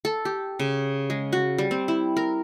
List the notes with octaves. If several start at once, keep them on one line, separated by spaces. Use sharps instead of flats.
A4
G4
C#3
G#3
F#4
G3
C4
E4
A#4